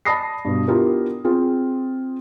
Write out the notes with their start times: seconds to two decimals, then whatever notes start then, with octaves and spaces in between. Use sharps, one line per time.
0.05 D5 A5 B5 D#6 A#6 C7
0.45 G2 B2
0.67 B3 D4 E4 F4 G4 A#4
1.24 C4 F4 G#4